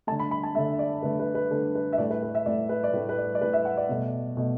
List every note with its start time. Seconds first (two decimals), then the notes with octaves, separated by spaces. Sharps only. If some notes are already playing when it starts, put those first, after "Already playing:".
0.07 A3 A5
0.11 D3
0.19 B5
0.31 B5
0.43 A5
0.55 D3 A3 E5
0.79 D5
1.02 D3 A3 B4
1.19 B4
1.35 B4
1.51 D3 A3 A4
1.75 B4
1.93 E5
1.98 A2 A3 D5
2.10 B4
2.23 B4
2.35 E5
2.46 A2 A3 D5
2.69 B4
2.84 D5
2.93 A2 B4
2.97 A3
3.09 B4
3.18 D5
3.35 D5
3.41 A2 A3 B4
3.53 E5
3.65 F#5
3.77 D5
3.89 B2 A3
4.37 B2 A3